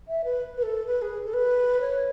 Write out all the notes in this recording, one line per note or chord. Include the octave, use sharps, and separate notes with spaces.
E5
B4
B4
A4
B4
G#4
A4
B4
C#5